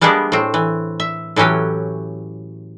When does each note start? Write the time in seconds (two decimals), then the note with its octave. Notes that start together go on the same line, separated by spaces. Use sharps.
0.01 G3 G#3 A#3 B3 D4
0.32 A2 C4
0.54 E3
1.00 E5
1.36 A2 E3 F#3 C#4 G4